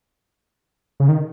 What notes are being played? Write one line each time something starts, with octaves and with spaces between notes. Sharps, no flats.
C#3
D#3